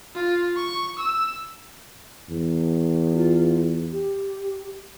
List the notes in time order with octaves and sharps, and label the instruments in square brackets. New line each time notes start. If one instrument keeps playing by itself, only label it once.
[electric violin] F4
C#6
E6
[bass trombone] E2
[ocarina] F4
G4